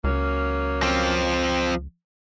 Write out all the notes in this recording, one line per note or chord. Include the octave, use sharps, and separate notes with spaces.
C#2 F#3 A#3 C#4
F3 C4